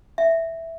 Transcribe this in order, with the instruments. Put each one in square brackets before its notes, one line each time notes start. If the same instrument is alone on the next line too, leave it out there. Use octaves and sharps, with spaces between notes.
[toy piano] E5